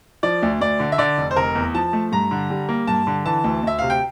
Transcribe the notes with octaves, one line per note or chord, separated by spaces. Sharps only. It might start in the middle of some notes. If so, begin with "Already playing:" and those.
F3 D5
D2
D2 D5
D3
E5
D3 D5
F1
C5
F1 A#4
E2
F3 A5
A3
G2 A#5
D3
G3
A#3
G2 A5
D3
E3 A5
D2
D2 E5
C3 F5
G5